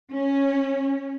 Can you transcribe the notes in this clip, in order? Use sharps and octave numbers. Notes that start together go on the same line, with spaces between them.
C#4